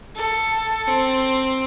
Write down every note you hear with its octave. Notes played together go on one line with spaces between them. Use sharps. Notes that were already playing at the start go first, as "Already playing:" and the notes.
A4
C4